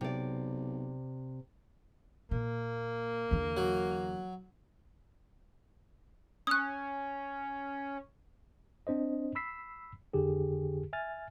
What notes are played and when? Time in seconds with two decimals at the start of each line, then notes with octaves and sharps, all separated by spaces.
0.01 B1 C3 D5
2.31 A#2 A#3
3.31 E2 D3
3.57 F#3
6.47 C#4 D#6 F#6
8.87 C4 D4 C5 D#5
9.35 B5 E6 B6 C7
10.13 F2 D3 G4 G#4
10.93 E5 G#5 F6 A6